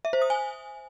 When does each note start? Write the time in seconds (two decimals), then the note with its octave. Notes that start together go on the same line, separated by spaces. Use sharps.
0.05 E5
0.13 C5
0.22 D#6
0.30 G#5